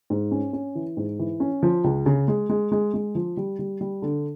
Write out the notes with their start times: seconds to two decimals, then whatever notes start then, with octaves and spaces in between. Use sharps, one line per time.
0.10 G#2
0.31 C#4
0.53 C#4
0.75 E3
0.97 G#2
1.19 E3
1.40 C#4
1.63 F3
1.84 C#2
2.06 C#3
2.28 G#3
2.49 G#3
2.72 G#3
2.94 G#3
3.15 F3
3.37 G3
3.59 G3
3.81 G3
4.02 D3